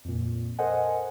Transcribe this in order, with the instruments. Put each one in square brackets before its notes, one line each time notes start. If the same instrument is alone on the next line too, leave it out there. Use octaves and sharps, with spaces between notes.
[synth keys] F2 A#2
A4 A#4 C5 D#5 F#5 G#5